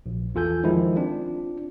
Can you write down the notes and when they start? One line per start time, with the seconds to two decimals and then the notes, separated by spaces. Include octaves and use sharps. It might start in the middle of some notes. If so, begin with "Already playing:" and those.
0.06 A#1
0.35 E2 E3 F4 A4 G#5 G6
0.64 D#3 F3 G#3 E4
0.97 C4 D4 F4